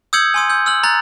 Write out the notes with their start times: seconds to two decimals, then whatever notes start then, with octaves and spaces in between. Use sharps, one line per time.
0.13 D#6 E6 G6 G#6 C#7 F#7
0.34 G#5 C6 D#6
0.50 E6 G6
0.66 E6 F6 F#7
0.83 A#5 F#6 A6